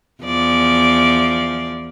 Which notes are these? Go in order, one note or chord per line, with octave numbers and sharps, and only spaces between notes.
E2 F3 D5